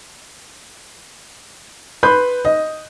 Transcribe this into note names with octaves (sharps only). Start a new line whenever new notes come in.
B4 B5 C6 F#6 G6
D#5